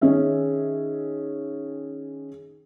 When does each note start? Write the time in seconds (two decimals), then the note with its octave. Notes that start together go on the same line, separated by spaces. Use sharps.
0.01 D#3 C#4 G#4 E5